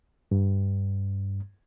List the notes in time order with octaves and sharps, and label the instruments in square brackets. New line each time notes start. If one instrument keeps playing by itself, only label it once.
[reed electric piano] G2